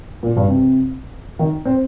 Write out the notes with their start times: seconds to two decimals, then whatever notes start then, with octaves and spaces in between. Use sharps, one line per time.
0.23 A#2
0.36 G2
0.48 C3
1.39 D#3
1.65 C4